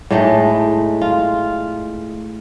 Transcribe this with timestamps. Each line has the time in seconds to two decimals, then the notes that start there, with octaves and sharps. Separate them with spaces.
0.11 A2 G#3 A3 D#4
1.01 F4